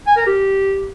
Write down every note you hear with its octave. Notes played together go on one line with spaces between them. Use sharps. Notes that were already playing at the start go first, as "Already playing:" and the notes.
G#5
A#4
G4